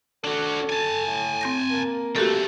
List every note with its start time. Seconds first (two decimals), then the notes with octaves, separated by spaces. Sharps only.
0.24 D4 F#4 A4
0.70 G#5 A5
1.07 A2
1.41 C4 G6 A#6
1.71 A#3
2.16 G2 A3 F#4 G4 A4